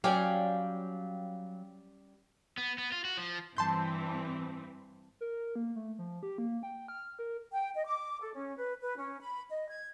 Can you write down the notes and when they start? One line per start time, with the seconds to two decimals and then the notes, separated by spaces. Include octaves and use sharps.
0.04 F#3 G3 C#4 G4 F5 G5 G#5
2.58 B3
2.78 B3
2.92 F4
3.05 F#4
3.17 F3
3.57 G2 E3 C4 A5 C6 G6
5.21 A#4
5.56 A#3
5.76 A3
5.99 F3
6.23 G4
6.38 A#3
6.63 G5
6.88 F6
7.19 A#4
7.53 G5
7.74 D#5
7.86 D6
8.21 A4
8.35 C#4
8.56 B4
8.81 B4
8.97 C#4
9.21 B5
9.50 D#5
9.70 G#6